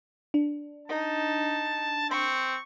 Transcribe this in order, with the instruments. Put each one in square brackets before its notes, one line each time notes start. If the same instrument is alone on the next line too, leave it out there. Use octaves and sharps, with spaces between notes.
[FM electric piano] D4
[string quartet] D#4 [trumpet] A5
[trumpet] C4 [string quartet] C#6